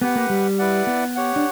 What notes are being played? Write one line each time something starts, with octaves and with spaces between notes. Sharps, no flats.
B3 G4 B4 F#5
A#3
G3
E4 B4 D5 F#5
B3
G4 C#5 F#5
D4